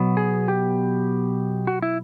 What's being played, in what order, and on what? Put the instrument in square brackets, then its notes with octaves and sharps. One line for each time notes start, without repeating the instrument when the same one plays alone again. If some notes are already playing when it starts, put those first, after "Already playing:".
Already playing: [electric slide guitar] B2 F#3 B3
G#4
G4
F#4
E4